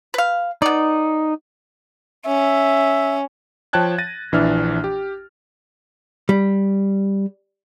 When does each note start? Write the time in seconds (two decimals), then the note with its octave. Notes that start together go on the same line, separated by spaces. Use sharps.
0.14 B4 F5
0.62 B3 D#4 D5
2.26 C#4 E5
3.73 F3 C#5 G5 A5 F#6 G#6
3.98 A6 A#6 D#7
4.32 A#1 E3 D4 E5 F6
4.84 G4
6.29 G3